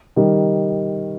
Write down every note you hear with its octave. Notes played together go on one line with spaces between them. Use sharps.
D#3 G3